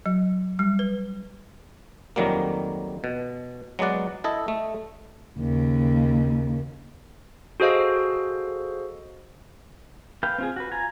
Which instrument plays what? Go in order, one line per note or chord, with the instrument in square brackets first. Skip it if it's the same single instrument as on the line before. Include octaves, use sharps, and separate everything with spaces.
[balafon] F#3
G3
B4
[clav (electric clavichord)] F2 D#3 F#3 G3 A#3
B2
F#3 G#3 B3 D5 F#5
E4 A4 D#5
A3
[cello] D#2 C#3
[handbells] F#4 G#4 A4 C5 D#5 F5
[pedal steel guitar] B4 F5 G5
C4 F4 G#4
F#4 B4
F4 G#5 A#5